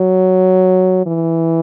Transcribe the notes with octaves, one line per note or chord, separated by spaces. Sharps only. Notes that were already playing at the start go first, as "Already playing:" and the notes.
Already playing: F#3
E3